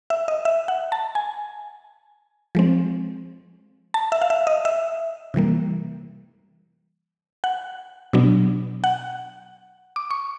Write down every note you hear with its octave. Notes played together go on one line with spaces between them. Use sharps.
E5
D#5
E5
F#5
A5
G#5
F3 G#3 C4
A5
E5
F5
E5
D#5
E5
C3 E3 G3 A#3
F#5
B2 F#3 B3 D4
F#5
D6
C#6